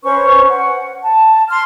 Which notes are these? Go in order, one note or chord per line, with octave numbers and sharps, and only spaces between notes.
C#4 B4 C5 C#6
F#5
A5
C6 F6